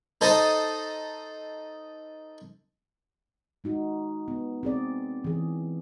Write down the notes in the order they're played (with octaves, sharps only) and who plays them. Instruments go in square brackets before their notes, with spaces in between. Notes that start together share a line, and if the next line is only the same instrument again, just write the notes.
[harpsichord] D#4 A4 C5 D#5
[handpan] G#3 D#4 F#4
B3
C4 G#4 D5
E3 G#4